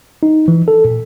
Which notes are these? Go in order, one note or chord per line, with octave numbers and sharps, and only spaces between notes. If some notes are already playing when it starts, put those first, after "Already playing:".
D#4
E3
A4
A#2